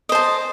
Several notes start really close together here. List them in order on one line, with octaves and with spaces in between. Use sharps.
D#5 C5 A5